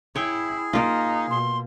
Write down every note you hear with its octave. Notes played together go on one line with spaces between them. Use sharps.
E4 G#4 C#5 G5
A#3 D#4 F4
B2 C6